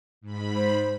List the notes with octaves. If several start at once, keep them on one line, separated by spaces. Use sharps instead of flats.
G#2 B5
C5